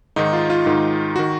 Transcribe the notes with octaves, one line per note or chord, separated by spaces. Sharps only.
G#2 D#3 D#4
F4
F4
G#2 D#3
D#3 F#4